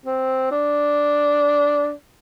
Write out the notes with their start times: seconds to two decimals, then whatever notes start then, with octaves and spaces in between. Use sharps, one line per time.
0.06 C4
0.51 D4